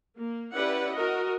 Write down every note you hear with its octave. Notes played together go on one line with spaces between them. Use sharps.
A#3
C#4 E4 G4 B4 D5 F#5
F#4 A#4 D#5